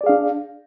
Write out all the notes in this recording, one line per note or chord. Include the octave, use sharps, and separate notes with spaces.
D4 G#4 D5 F5